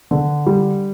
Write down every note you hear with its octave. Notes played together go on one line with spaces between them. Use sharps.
D3
G3